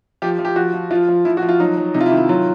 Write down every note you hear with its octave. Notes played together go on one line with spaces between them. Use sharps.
F3 G4
F3
G4
F3 F#4
F3
F3 F4
F3
F3 E4
F#4
F3
F4
F#3 D#4
F#3
C3 D#4
F4
E4
D#3
E4
F#3 F4